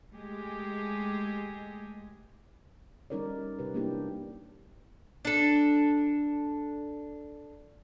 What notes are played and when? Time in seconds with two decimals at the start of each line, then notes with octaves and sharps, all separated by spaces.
0.13 G#3 A3 G4 G#4
3.10 G3 C#4 D#4 A#4 C#5 D5
3.59 C3 G4 B4
3.74 G#3 A#3 B3 D4 E4 G4
5.25 D4 A4